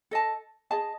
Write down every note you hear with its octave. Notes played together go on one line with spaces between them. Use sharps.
A4 D#5 A5
G#4 D#5 A5